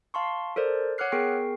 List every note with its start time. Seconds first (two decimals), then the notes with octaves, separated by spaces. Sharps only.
0.14 F5 A5 C6 C#6
0.56 A4 A#4 C5 D5
0.98 C#5 F#5 D6 F6 F#6 C7
1.12 B3 G#4 A#4 G5 C#6 C7